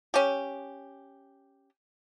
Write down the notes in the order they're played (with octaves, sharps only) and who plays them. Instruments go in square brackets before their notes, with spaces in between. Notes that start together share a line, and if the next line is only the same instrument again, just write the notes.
[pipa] C#4 G4